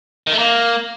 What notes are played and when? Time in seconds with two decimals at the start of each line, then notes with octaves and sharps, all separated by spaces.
0.27 D#3
0.33 A3
0.38 A#3